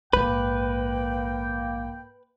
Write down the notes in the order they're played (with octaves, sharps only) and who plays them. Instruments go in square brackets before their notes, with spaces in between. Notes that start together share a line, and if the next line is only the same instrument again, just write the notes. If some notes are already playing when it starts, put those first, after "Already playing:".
[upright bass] A#1 G#2 [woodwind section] A#3 G5 [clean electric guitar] B4